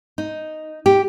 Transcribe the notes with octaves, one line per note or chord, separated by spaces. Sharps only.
D#4
G4